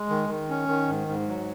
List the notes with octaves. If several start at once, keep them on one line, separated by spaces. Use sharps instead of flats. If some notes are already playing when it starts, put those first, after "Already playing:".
Already playing: G#3
D#3
D#3
C#4
D#3
G#2
G#2
F#3